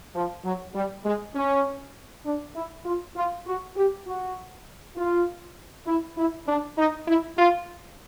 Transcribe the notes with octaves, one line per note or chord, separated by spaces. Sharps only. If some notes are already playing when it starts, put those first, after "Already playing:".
F3
F#3
G3
G#3
C#4
D4
E4
F4
F4
F#4
G4
F#4
F4
E4
E4
D4
D#4
E4
F4